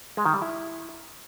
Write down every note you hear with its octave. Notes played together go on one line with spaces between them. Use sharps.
G#3
D#3
G3
E4